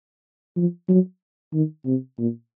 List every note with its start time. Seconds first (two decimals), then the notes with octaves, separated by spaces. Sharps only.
0.56 F3
0.89 F#3
1.54 D#3
1.86 C3
2.19 A#2